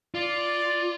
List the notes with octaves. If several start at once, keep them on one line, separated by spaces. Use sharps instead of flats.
F4 D5